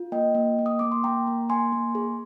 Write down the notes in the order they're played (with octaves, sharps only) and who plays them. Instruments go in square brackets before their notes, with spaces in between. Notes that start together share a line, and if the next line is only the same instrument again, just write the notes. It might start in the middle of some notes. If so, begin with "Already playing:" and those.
Already playing: [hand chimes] F4
A#3 D#5 G5
A#3
A#3
D#6
A#3 D6
C6
A#3 G5 A#5
A#3
A#3 G#5 C6
A#3
G#4